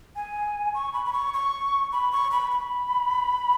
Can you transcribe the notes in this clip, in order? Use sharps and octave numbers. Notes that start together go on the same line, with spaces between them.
G#5
C#6
B5
B5
C#6
C#6
B5
C#6
B5
B5